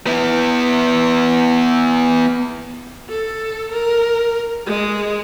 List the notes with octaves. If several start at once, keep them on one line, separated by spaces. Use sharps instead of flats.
B3 E4
A4
A#4
G#3